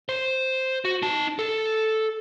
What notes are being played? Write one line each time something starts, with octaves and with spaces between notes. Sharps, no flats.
C5
F#4
D#4 A5
A4